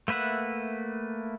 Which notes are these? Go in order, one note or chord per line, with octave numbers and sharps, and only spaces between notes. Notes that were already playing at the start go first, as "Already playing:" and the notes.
A3 A#3 B4 E5 F#5